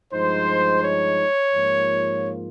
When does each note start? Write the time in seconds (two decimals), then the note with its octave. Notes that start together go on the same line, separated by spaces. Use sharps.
0.13 G2 F3 G#3 D#4 C5
0.83 C#5
1.54 G#2 F3 A#3 F4